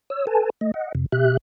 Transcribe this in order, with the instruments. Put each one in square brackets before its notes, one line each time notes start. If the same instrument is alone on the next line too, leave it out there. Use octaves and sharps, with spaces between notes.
[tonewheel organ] C#5 E6
A4 B4 G#5 A5
A3 D#5
D#5 F#5
F2 C3
B2 G4 E5 F#6